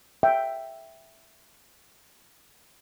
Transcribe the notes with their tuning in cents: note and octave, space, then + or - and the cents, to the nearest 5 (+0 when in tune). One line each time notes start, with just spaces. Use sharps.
E5 +0 G5 +0